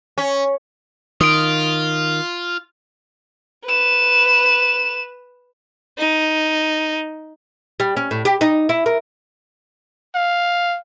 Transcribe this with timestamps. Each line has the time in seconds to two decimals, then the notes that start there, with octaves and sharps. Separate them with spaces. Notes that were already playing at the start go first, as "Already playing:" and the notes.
0.18 C#4
1.21 D#3 F4 D#6 D7
3.66 B4 E7
5.98 D#4
7.80 G3
7.97 C#4
8.11 A2
8.25 G4
8.41 D#4
8.69 E4
8.86 A#4
10.15 F5